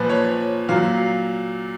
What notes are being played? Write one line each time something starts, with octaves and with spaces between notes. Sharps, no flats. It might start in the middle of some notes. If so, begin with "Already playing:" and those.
Already playing: A#2 F3 B4
C#5
A#2 F#3 F5